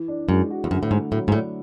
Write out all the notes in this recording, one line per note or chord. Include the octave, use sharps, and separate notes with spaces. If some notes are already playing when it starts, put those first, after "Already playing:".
Already playing: E3
D4
F#2 G#3
F#4
E2
F#2 D3
A2
G#2 A3
A2 F#3
G#2
A2 D4